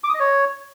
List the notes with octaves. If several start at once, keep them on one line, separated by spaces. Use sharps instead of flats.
D6
D#6
D#5
C#5